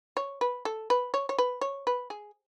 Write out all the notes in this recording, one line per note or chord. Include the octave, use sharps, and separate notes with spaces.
C#5
B4
A4
B4
C#5
C#5
B4
C#5
B4
G#4